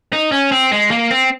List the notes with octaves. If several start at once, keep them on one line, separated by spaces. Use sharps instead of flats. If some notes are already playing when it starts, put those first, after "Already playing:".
D#4
C#4
C4
G#3
A#3
C4